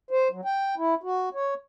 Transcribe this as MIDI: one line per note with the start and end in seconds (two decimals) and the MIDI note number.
0.11 0.28 72
0.31 0.41 54
0.45 0.75 79
0.77 0.94 64
1.03 1.29 66
1.34 1.54 73